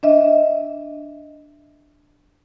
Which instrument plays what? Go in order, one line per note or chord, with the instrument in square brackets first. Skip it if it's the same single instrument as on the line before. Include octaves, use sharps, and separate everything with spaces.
[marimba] D4 D#5 E5